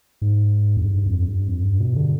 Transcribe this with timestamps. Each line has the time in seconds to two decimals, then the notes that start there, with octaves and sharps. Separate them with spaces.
0.22 G#2
0.77 F2
0.85 G2
1.06 F2
1.28 G2
1.48 F2
1.64 G2
1.80 B2
1.96 D3